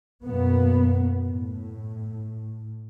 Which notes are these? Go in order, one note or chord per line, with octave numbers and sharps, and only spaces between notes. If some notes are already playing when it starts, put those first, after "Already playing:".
F#2 B2 A#3 B3
A2